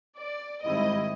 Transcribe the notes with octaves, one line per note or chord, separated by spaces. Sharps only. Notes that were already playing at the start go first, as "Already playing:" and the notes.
D5
G#2 D#3 G3 C4 E4 D#5